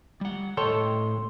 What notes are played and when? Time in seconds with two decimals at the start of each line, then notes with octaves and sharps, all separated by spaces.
0.21 G3 F#5
0.57 A2 A4 C#5 D#5 G5 C6